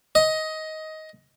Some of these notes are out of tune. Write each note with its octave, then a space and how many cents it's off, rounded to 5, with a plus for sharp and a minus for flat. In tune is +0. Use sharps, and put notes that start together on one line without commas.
D#5 +15